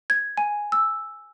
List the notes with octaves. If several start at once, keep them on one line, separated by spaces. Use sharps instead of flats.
G#6
G#5
E6